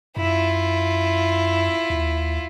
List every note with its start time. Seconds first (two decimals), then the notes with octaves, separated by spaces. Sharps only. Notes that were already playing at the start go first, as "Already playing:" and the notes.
0.17 F#2 E4 F4
1.90 D#2